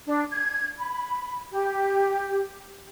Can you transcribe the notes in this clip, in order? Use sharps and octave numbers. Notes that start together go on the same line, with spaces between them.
D4
G#6
B5
G4